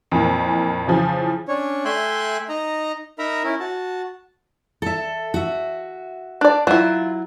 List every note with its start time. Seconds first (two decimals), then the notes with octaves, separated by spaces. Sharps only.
0.11 F2 A#2 E3 A#3
0.87 C#3 E3 F3
1.48 C#4 D4 C#5
1.85 A3 E5 G5 G#5 C6 F#6
2.49 D#4 D#5 A#5
3.19 D#4 A#4 E5 A#5 B5
3.44 C#4 E4 A#4
3.60 F#4 A5
4.82 A4 E5
5.34 F#4 E5
6.41 D4 D5
6.67 F#3 E4 F4